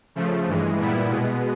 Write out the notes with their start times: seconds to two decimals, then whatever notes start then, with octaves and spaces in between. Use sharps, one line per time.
0.15 C#3 F3 A3
0.47 G2 E3 G#3
0.79 A#2 G3 B3 E4
1.10 B2 G#3 B3